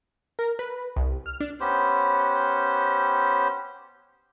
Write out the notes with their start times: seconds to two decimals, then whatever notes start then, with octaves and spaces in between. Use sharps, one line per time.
0.39 A#4
0.59 B4
0.96 C2
1.26 F6
1.40 D4
1.60 B3 C#4 G4 C5